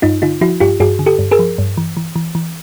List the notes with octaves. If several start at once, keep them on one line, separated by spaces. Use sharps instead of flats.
G2 D#4 F4
D3 D#4 F4
F3 E4 F#4
G2 F4 G4
G2 F#4 G#4
D3
G4 A4
G2
G#4 A#4
F3
G2
E3
E3
E3
E3